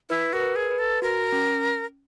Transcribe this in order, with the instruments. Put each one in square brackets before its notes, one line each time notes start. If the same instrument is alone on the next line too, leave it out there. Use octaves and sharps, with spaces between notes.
[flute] E4 [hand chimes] B4
[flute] F#4 [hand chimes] A#4
[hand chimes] B4
[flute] G#4
[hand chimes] B4
[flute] A4
[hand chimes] F#4 [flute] A#4
[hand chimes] C#4